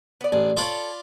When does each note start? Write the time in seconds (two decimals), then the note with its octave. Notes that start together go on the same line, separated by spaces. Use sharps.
0.21 B3 D5
0.32 A1 D4 G#4
0.57 F4 A4 A#4 C#5 D5 B5